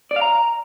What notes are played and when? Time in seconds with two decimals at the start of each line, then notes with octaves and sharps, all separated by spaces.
0.11 D5
0.16 F5
0.21 A#5